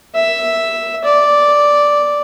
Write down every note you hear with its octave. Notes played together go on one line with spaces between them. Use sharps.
E5
D5